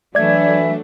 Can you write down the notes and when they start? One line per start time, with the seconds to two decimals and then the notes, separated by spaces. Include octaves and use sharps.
0.15 E3 F#3 A3 D4 D5 E5 G#6